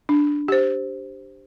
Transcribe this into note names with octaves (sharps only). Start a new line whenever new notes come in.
D4
G4 C5